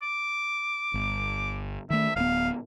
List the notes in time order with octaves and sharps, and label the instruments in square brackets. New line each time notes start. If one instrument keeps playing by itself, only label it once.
[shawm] D6
[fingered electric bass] G1
[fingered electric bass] D#3 A3 [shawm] E5
[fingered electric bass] D1 B3 [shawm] F5